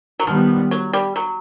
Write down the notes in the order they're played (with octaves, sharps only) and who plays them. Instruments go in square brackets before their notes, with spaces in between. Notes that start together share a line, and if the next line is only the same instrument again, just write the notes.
[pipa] F#3
[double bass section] D#3 G3 B3 [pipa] F3
[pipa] F#3
G3
F#3